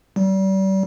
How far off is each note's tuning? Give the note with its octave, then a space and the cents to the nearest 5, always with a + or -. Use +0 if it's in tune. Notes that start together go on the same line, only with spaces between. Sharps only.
G3 -35